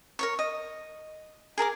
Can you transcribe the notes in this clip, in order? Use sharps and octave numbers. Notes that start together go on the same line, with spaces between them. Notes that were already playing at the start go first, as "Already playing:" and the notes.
A#4 C#5 C#6
D#5
G#4 A#4 A5 D6